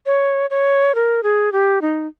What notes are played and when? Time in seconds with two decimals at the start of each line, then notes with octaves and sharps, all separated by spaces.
0.06 C#5
0.50 C#5
0.95 A#4
1.23 G#4
1.52 G4
1.82 D#4